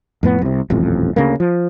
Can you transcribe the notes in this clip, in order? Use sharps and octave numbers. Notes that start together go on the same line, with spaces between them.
F2 A2 B3
C2 C3
D#1 A1 F2
D2 C#3 A3 A#3
F3